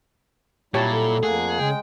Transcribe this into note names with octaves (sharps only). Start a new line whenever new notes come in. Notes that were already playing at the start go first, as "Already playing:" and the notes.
A#2 F#3 G3 E4 G4 C#5 A5
A4
F2 A3 A#3 G#4 F#5
C#3 G#3 G5